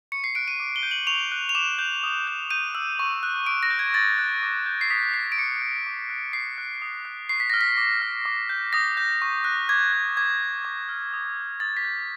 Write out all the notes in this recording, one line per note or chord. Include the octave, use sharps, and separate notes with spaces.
C#6 C#7
C7
F#6 D7
D#7
D6
G7
G6
F#7
C#6 F7
F#6
F7
D6 E7
G6
D#6
G6
G6 D#7
E6
C#6
F#6
D6 D7
A#6
G6
G#6
C#6 A6
F#6
D6
G6
C7
D#6 B6
G6 C7
D7
D6 C#7
F#6
D6
F#6
D6 C7
F#6
D#6
F#6
C#6 C7
B6
F6 A#6
B6
D6
F6
D6
G6
D#6 A#6
G6
C#6
F#6
D6 G#6
F#6
D6 G#6
F#6
D6
F6
D#6
G6
D#6 A6
B6
G6